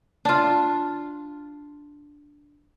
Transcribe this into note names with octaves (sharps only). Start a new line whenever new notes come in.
D4 F4